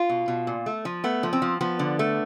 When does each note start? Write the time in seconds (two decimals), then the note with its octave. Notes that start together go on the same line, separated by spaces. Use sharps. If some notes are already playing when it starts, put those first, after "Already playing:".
Already playing: F4
0.09 B2
0.28 B2
0.47 A#2
0.66 A3
0.85 F3
1.04 A3 B3
1.23 F3
1.33 C4
1.42 F3
1.61 F3 B3
1.79 D3
1.99 A3